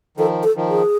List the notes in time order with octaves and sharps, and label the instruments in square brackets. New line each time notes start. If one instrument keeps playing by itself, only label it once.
[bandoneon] D#3 F3 [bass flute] A4
[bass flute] A4
[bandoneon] D#3 F3
[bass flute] G#4